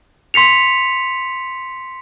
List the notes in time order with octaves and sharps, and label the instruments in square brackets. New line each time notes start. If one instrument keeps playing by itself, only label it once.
[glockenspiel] C6 B6 C#7 F7